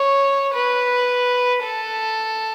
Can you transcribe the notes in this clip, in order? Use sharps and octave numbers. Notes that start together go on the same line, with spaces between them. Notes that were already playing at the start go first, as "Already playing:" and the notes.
Already playing: C#5
B4
A4